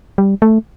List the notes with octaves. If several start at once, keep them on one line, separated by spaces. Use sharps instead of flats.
G3
A3